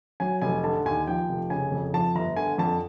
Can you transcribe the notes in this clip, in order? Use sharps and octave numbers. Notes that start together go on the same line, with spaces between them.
F#3 G#5
F1 G#5
D3 A5
D#2 G#5
F3 G5
F1
C#3 G#5
F2
F3 A5
G1 A#5
D3 G#5
F2 A5